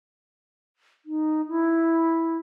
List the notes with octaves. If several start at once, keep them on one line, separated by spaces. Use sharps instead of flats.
D#4
E4